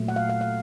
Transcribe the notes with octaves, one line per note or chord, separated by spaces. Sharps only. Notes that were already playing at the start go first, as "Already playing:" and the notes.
Already playing: A#2 F#3 A3
F#5
F5
F5
F5